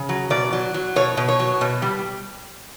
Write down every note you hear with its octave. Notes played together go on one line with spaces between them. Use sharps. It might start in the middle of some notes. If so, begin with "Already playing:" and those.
Already playing: C#3
F#3
B2 D5
F#3
F#3
B2 C#5
B2
C#5
F#3
B2
G3